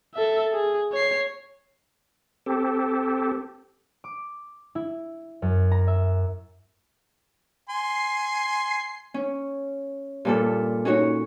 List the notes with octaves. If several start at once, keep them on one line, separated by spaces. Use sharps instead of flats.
A4 E5
G#4
C#5 C7
C4 G4 A4
D6
E4
F#2
A#5
E5
G#5 C6 C7
C#4
G2 A#2 A4
C#4 D#4 F#4 C#5